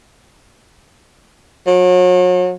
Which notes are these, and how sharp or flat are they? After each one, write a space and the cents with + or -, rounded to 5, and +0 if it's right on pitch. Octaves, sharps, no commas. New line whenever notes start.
F#3 -35